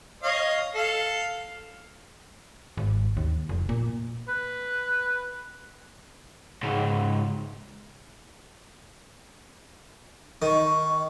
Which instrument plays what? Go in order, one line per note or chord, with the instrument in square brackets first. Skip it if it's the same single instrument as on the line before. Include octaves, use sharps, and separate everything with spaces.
[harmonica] C#5 D#5 F5
A4 F5
[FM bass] G#1
D#2
F1
A#2
[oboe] B4
[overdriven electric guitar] C#2 G#2
[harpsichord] D#3 [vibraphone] D#5 C#6